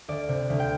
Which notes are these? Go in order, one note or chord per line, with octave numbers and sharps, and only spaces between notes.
D2 D5
C3
D2
G5